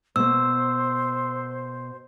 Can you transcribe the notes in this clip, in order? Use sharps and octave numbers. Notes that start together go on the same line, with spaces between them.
B2 A#3 C5 E6